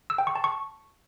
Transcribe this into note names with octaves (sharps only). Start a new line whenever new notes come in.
E6
G5
C#6
A5
C#6